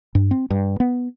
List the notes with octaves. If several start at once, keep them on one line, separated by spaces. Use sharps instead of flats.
G2
C4
G2
B3